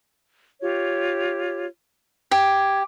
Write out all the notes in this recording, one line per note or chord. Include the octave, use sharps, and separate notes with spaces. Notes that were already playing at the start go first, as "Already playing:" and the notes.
F4 G4 C#5
G4 G#6